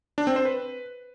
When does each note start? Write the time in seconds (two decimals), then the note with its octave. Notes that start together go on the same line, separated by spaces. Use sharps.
0.18 D4
0.27 C4
0.36 C5
0.45 B4